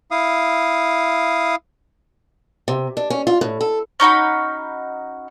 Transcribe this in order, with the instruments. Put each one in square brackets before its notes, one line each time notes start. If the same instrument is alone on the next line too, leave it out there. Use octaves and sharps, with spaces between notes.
[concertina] E4 F5 D#6
[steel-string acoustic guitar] C3
D4
C#4
F4
A2
A4
[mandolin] C#4 D#4 F#4 B5